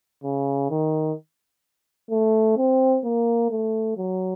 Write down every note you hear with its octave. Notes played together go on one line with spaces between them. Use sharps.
C#3
D#3
A3
C4
A#3
A3
F#3